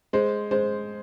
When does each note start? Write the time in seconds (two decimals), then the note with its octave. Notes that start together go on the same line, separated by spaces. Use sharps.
0.13 G#3 C5
0.51 G#3 C5